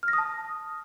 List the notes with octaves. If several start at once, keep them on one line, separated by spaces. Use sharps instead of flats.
F6
A#6
D#6
A5